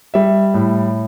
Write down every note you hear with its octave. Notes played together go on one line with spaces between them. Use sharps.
G3 E5
A2